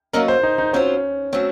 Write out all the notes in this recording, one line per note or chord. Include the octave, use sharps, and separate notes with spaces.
F#3 A#3 C#4 A4 A#4 D#5
C5
D#4
D#4
F#3 C4 C#4 F4 C5
F#3 A3 C4 C#4